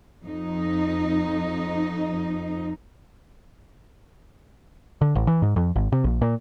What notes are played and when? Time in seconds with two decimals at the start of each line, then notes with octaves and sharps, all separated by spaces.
0.24 F2 D#4
5.01 D3
5.15 A1
5.27 E3
5.42 G#2
5.56 F2
5.76 G#1
5.92 C3
6.04 A#1
6.22 A#2